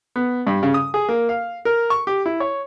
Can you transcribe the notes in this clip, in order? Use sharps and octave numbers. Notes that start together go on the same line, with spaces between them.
B3
G2
C#3
D#6
G#4
A#3
F5
A#4
C#6
G4
E4
C#5